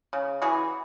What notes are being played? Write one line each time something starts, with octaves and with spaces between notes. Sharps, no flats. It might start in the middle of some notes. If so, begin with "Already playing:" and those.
C#3
E3 F#4 G#4